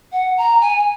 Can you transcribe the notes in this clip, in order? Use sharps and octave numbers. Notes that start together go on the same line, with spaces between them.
F#5
A#5
G#5